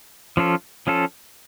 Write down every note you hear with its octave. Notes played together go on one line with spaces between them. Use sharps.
F3 C#4 F4 A4
F3 C#4 F4 A4